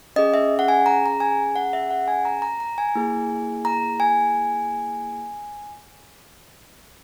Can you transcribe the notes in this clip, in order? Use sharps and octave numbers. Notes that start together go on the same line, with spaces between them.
C#4 G#4 D#5
E5
F#5
G#5
A#5
A#5
G#5
F#5
E5
F#5
G#5
A#5
A#5
A#5
G#5
A#3 E4 G#4
A#5
G#5